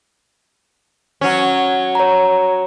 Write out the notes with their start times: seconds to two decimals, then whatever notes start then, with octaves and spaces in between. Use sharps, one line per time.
1.21 F#3 C#4
1.95 C#5 A#5